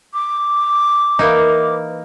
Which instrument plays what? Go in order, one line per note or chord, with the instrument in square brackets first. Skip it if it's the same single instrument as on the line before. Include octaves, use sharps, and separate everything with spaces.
[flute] D6
[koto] E3 A#3 D#4